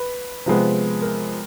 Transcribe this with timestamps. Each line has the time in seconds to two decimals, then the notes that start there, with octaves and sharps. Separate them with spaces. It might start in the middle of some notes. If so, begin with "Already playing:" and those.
Already playing: B4
0.46 C3 F3 G#3 B3
1.02 A#4